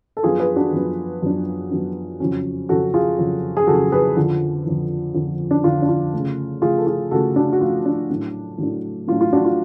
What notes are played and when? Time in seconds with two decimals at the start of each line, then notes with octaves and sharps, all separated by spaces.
0.17 A4
0.23 F#2 F3 B3 D4 F4 G#4
0.39 G#4 B4
0.56 D4 F#4
0.72 F#2 F3 B3 D4
1.22 F#2 F3 B3 D4
1.71 F#2 F3 B3 D4
2.20 F2 C#3 F#3 C#4
2.69 F2 C#3 F#3 C#4 F#4 A4
2.94 F4 G#4
3.18 F2 C#3 F#3 C#4
3.57 G#4
3.67 F2 C#3 F#3 C#4 F#4 A4
3.92 G#4 B4
4.16 F2 D3 F3
4.66 F2 D3 F3
5.14 F2 D3 F3
5.51 D4
5.64 F2 D3 F3 F4
5.82 D4
5.88 F4
6.13 C#3 F3 A3
6.62 C#3 F3 A3 F4 G#4
6.78 A4
6.87 F4 G#4
7.11 C#3 F3 A3 F#4 A4
7.36 D4 F#4
7.53 F#4
7.61 C#3 F3 A3 F4
7.85 D4
8.10 A2 F#3 A3 D4
8.58 A2 F#3 A3 D4
9.08 A2 F#3 A3 D4 F4
9.21 F4
9.33 D4 F#4
9.45 F4